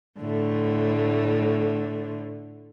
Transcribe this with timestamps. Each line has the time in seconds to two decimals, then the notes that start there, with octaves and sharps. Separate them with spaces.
0.19 A2 D3 A3